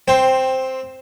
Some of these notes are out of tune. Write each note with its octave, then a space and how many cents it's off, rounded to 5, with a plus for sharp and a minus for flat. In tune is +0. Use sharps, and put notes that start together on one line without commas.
C4 +0 C5 +15